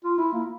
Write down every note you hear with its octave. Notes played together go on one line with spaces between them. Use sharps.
F4
E4
A#3